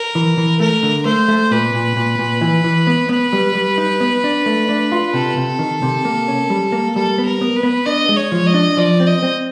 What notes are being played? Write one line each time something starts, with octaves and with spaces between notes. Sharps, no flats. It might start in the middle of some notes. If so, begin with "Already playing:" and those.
Already playing: A#4
E3
E3
A3 A#4
D3
A3 C5
A3
A#2 B4
A#2
A#2
A#2
E3
E3
B3
B3
G3
G3
D#4
B3
D4
A3
D4
F4
C3 A4
C3
D#3
C3
A#3
C#4
G3
A#3
G3 A4
B3
A#4
B3
B4
B3
D4 D#5
G#3
C#5
F3
D#5
D4
F3 D5
C4
D#5
C4